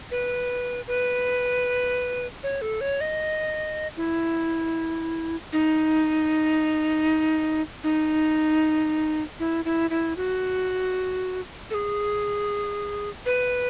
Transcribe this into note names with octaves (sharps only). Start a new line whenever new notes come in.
B4
B4
C#5
A4
C#5
D#5
E4
D#4
D#4
E4
E4
E4
F#4
A4
G#4
B4